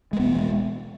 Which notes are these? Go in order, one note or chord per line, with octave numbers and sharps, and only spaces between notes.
G#3
E1 E2 B2 B3
G#3